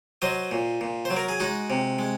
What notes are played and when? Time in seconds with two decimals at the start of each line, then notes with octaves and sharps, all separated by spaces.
0.22 F#3 C5 D#5
0.51 A#2
0.81 A#2
1.05 C5
1.10 F#3
1.16 A#4
1.29 G#4
1.40 G#3 D#4 F#4
1.70 C3
1.99 G#3